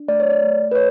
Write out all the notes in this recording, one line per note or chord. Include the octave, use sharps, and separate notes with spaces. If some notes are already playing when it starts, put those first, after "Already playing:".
Already playing: D4
A3 D5
C#5
D5
A3
B4
C#5